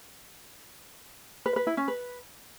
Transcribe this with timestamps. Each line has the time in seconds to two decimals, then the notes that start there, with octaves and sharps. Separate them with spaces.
1.46 B4
1.56 B4
1.67 E4
1.77 C#4
1.88 B4